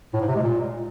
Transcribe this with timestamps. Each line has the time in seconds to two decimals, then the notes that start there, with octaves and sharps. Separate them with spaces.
0.14 A2
0.21 G#2
0.28 C3
0.35 G#3
0.42 A#2